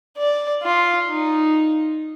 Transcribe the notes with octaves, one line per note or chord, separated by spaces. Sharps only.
D5
F4
D#4